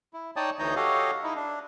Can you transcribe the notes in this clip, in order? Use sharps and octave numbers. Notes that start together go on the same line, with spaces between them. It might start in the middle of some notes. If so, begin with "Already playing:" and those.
E4
D#4 C#5 D5 G5 A5 D#6
D2 E3 D#4 C#5 D#5 G6
F#4 G4 A4 C#5 D#5 F5
D#4 E4
D4